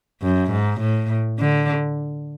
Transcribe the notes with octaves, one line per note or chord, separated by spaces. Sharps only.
F#2
G#2
A2
D3